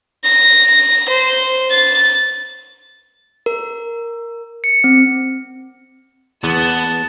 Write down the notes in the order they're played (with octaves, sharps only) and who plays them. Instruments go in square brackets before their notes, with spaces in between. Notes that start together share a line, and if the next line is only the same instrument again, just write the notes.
[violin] A#6
C5
A6
[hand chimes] A#4
C#7
C4
[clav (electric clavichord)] E2 [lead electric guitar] B3 [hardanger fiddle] A5